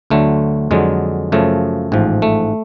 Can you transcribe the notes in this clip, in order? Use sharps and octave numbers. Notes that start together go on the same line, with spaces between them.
D2 D3 F#3 A3
F2 D3 F#3 G#3
F#2 C#3 F3 A3
A1 G#2 F3
A3